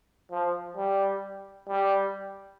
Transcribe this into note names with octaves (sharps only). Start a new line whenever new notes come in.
F3
G3
G3